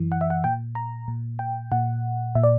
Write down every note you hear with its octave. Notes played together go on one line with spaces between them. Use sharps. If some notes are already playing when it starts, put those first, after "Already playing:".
Already playing: F#2 E3
F#5
E5
F#5
A#2 G5
A#5
A#2
G5
A#2 F#5
A#2 E5
D5